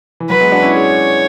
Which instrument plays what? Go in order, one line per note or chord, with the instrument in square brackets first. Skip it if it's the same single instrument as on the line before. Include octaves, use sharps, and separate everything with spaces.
[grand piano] E3
[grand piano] F#3 [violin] B4
[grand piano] G#3 B3
D4 F#4
C#4 E4
[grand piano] E4 G#4 [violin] C#5